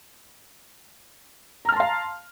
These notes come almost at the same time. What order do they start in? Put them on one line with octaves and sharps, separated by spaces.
A#5 F6 A5 C6 F5